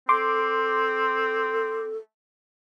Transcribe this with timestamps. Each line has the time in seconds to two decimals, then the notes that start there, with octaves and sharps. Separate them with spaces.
0.09 C4 A4 C6 D6